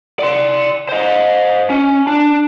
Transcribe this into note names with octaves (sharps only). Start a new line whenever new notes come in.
D5 C6
C5 D#5
C#4
D4